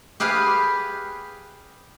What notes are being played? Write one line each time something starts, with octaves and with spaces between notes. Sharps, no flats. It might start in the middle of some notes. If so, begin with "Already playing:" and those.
G4 G#4 B4 F5